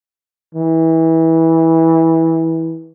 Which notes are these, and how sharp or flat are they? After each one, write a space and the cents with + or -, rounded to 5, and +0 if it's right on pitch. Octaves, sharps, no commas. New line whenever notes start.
E3 -20